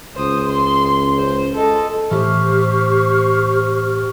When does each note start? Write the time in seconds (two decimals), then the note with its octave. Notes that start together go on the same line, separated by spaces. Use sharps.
0.16 C#2 C5 D#6
0.46 C6
1.18 C5
1.55 A4 D#5
2.11 A2 E3 G4 C5 C#6 F6